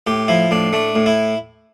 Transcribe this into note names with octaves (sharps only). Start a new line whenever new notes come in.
A2 G4
F3 E4
A2 D4
A3 D4
A2
E4